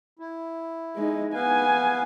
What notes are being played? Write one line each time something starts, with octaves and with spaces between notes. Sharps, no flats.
E4
G#3 D#4
B3 B4 F5 G#5